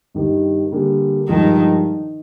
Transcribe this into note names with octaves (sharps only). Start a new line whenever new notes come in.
G2 D#3 G3
D3 G3 A#3 D4 G#4
G2 D#3 F3 G#3 D4